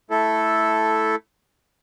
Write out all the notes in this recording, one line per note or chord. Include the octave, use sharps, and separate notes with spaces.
A3 E4 A4